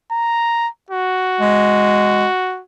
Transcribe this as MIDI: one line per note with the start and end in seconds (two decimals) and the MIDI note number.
0.12 0.68 82
0.91 2.62 66
1.41 2.26 56